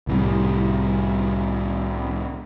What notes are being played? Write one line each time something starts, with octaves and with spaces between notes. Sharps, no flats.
C2 A2 C3 G3